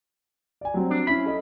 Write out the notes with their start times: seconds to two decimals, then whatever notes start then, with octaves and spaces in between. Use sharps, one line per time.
0.61 D5 G#5
0.74 F#3 G3 C4
0.90 D4
1.07 C#4 E4 B5
1.26 A4 D#5